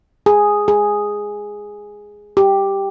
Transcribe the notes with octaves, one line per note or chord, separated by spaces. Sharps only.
G#4
G#4
G4